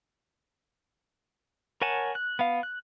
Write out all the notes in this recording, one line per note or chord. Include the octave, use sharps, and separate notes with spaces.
A#4 C#5 F#5 G#5 A5
F#6
B3 F5
F#6